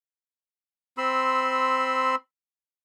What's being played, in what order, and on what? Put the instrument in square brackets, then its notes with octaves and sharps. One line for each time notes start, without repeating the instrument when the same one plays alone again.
[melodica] C4 B5 C6 E6